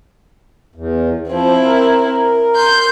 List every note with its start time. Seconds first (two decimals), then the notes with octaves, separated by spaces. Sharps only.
0.75 E2
1.30 F3 C4 E4
1.65 A#4
2.56 C6 G6